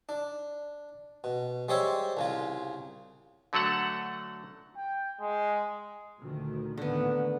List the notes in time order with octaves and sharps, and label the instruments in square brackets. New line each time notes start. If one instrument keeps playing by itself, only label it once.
[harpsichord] D4
B2
G3 G#3 G4 C5 C#5 E5
C2 C#3 F4
[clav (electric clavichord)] D3 F#3 A3 A4 F#5
[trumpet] G5
G#3
[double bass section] D2 A#2 D#3
[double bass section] A2 D#3 A#3 [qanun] D3 B3